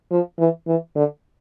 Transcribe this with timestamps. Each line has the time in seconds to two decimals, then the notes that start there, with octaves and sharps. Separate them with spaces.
0.11 F3
0.39 E3
0.67 E3
0.96 D3